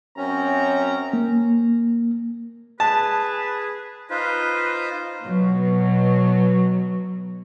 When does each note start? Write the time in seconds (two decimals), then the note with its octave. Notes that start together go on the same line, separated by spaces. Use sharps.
0.17 F#2 C4 C#4 A#5
1.13 A#3
2.80 G#4 B4 A5
4.10 D#4 F4 B4 C5
5.24 B2 F#3